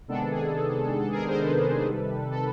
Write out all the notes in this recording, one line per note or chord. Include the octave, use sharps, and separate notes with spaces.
C3 D#3 G#3 B3 D4 A4
G#4
A4
G#4 A#4
A#4 C5
A4 B4
C3 D#3 G3
A4